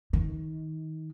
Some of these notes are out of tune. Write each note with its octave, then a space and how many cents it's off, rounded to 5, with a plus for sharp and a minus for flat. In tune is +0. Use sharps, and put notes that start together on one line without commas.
D#3 +25